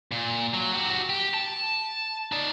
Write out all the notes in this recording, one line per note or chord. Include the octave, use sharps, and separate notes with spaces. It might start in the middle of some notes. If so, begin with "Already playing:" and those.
A#2
F#3
F#4 G4
G4
A5
D#4 D5